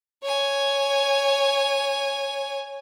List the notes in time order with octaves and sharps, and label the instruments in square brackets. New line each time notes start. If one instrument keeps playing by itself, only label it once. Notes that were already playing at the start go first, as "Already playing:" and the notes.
[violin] C#5 G#5